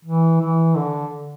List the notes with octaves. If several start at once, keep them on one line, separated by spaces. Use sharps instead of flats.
E3
E3
D3